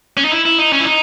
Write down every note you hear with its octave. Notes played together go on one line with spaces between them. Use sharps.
C#4
D#4
E4
E4
D#4
C#4
E4
D#4